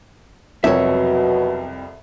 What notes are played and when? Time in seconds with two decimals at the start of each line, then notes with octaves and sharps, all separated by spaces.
0.64 C2 F2 B2 F#3 C#5 E5